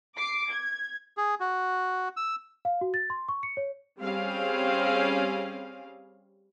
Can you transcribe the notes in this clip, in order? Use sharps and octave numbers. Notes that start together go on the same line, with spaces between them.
D6 C7
G#6
G#4
F#4
E6
F5
F#4
A6
C6
C#6
C#7
C#5
G3 C4 C#4 G#4 F5